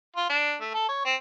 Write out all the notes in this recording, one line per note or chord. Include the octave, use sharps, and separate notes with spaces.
F4
D4
A3
A4
C#5
C4